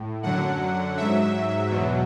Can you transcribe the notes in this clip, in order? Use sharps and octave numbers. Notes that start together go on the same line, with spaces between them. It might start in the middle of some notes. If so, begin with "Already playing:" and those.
Already playing: A2
F#2 D3 F#3 F#5
G#2 F#3 E5
E2 B2 F#3